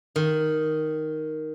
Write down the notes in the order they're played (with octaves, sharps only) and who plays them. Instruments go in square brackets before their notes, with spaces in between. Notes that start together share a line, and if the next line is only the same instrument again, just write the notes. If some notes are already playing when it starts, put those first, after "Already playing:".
[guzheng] D#3